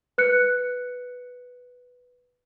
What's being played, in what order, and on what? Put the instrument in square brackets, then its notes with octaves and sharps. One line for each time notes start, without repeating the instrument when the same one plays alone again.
[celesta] B4 F#6 C#7